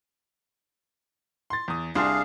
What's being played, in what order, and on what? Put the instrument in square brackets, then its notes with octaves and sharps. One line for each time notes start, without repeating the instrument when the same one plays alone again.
[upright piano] C6 A6
E2 D#6
[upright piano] C2 D4 C6 [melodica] G#4 F5